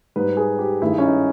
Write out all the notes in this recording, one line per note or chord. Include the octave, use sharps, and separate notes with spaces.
G#2 G3 B4
G#4
G4
G2 D#3 G#3 E4
C#4
D#4